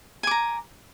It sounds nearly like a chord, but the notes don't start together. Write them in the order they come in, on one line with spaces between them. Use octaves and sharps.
G#5 D6 A#5